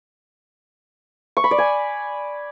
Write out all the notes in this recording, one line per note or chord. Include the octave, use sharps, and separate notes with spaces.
C#6
B5
D5
G#5